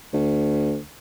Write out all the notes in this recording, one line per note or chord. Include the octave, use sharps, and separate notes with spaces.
D2